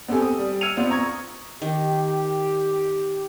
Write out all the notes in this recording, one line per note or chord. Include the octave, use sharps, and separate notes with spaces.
B3 C4 G4 A4 G#5
D#6
G3
E6 F6 G#6 C#7 D#7 F7
B3 C4 D4 F4
A#5 C#6 D#6 G#6
D#3 G4